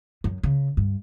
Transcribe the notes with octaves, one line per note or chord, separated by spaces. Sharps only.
F#2
C#3
G2